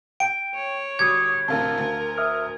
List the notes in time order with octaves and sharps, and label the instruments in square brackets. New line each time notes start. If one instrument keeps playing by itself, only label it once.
[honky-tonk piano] G5 [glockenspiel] D7
[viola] C#5
[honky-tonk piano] G1 G3 F#4 [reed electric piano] D6 D#6 [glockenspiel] G#6
[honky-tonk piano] A1 D2 C3 [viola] A#4 [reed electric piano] F5 A5
[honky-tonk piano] D2
[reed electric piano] E5 D#6 F6